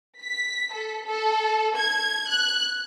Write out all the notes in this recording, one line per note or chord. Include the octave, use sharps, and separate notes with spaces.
B6
A4
A4
G#6
F#6